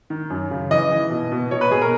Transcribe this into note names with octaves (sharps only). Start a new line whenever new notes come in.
D#3
F#2
C#3
E3 D#5
E3
B2
B2
B2 C#5
B4
B2 G#4
A#4